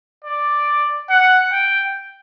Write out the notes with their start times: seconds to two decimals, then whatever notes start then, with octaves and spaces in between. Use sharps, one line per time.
0.25 D5
1.10 F#5
1.52 G5